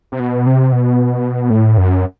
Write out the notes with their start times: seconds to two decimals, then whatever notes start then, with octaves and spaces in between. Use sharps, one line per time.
0.12 C3
0.20 B2
0.46 C3
0.72 B2
1.50 A2
1.78 F#2